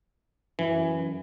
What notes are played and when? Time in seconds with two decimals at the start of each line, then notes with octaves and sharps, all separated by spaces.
0.59 F#2 E3